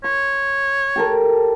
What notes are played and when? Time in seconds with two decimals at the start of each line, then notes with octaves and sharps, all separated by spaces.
0.04 C#5 C6
0.96 G4 A4 A#4